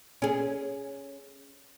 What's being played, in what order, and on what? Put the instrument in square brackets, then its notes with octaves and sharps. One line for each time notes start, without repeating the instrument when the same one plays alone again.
[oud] C#4 G#4